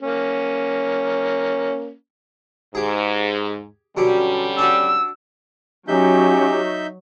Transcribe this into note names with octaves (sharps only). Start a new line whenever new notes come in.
A#3 C#4
G#2 G4 G#4
B2 D3 F#3 G3 C#4 G4
D4 F#4 E6
F#3 C#4 D#4 G4 E5 G6